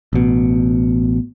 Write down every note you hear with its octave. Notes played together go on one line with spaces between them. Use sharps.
A1 B2